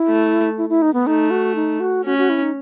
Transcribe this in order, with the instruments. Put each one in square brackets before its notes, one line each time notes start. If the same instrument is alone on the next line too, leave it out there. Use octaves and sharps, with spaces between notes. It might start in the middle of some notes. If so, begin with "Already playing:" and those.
Already playing: [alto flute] E4
[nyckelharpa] A3
[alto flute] E4
E4
D#4
B3
[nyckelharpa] A3 [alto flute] D#4
[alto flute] F#4
D#4
F#4
[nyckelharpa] C#4 [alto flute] F#4
[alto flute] F#4
E4
D#4